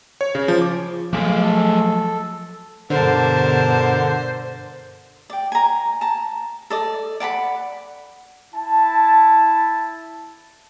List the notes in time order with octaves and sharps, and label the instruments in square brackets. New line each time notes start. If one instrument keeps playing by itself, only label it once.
[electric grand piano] C#5
C#3
F3
D6
[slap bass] F3 F#3 [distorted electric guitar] A3 G#4 [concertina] F5 D6
[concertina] A4
[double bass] G2 B2 [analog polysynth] D3 [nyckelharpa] A#4 A5 [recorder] C5
[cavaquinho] D5 G5
G#5 A#5
A5 A#5
A4 D5 D#5
D5 F#5 A5 B5
[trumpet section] E4 A5